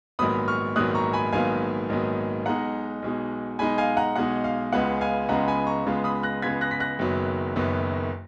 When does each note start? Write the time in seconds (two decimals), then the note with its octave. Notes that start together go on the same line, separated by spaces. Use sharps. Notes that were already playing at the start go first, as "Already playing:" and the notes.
0.19 A#1 G#2 D#3 F#3 B3 B5 D#6
0.48 C#6 F6
0.76 A#1 G#2 D#3 F#3 B3 D#6 F#6
0.95 A#5 C#6
1.13 G#5 B5
1.32 A#1 G#2 D#3 F#3 B3 F5 G#5
1.89 A#1 G#2 D#3 F#3 B3
2.46 B1 B2 G#3 D#4 F#5 A#5
3.02 B1 B2 G#3 D#4
3.59 B1 B2 G#3 D#4 G#5 B5
3.78 F5 G#5
3.97 F#5 A#5
4.16 B1 B2 G#3 D#4 F#5
4.44 F5
4.72 C#2 C#3 G#3 B3 F4 F#5
5.01 F5 G#5
5.29 C#2 C#3 G#3 B3 F4 F#5 A#5
5.48 G#5 B5
5.67 A#5 C#6
5.85 C#2 C#3 G#3 B3 F4
6.04 B5 D#6
6.23 F#6 A#6
6.42 C#2 C#3 G#3 B3 F4 G#6 B6
6.61 F#6 A#6
6.71 B6
6.80 F#6 A#6
6.99 F#1 F#2 D#3 F#3 B3
7.56 F#1 F#2 D#3 F#3 B3